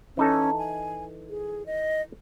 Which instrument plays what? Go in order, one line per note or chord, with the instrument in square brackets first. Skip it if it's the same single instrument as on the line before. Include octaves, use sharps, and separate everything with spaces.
[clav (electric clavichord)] E3 D#4 A4 [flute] C#4
[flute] G#5
G#4
D#5